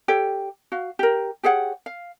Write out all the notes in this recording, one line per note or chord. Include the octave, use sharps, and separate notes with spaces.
G4 A4 C#5
F#4 F5
G4 A#4
G4 G#4 C#5 F#5
F5